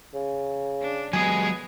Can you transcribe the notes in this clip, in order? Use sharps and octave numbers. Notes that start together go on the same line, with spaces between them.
C#3
D4
F#3 G#3 B3 G#4 G#5